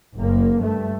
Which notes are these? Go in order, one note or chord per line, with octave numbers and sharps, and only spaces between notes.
F#1 A#3
G2 A3